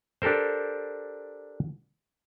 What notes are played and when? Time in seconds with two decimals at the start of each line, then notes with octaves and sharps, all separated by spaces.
0.22 D4 G4 A4 A#4 C5